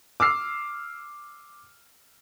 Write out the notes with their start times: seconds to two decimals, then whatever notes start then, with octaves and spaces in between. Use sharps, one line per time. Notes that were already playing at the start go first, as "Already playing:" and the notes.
0.20 D6 E6 F6 C7